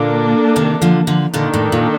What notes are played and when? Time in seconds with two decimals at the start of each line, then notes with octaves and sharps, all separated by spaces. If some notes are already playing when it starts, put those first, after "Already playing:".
Already playing: A#2 D3 A#3 D4 A4
0.56 C3 D#3
0.82 D3 F3
1.07 D3 F3
1.33 A#2 D3 D#3 A#3 D4 A4
1.54 A2
1.72 A#2